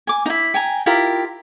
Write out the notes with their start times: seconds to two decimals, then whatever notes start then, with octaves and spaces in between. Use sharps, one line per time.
0.07 G#5 D6
0.26 D#4 E4
0.54 G5 G#5 A#5
0.86 E4 F4 G4 A#4